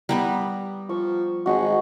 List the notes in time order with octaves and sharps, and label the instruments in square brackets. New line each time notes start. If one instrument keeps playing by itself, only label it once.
[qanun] G3 B3 B4 [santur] A#5
[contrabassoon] F3 [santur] C#6
[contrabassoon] G#1 [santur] G#3 D#4 F#4